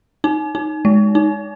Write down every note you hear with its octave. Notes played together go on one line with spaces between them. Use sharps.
D#4
D#4
G#3
D#4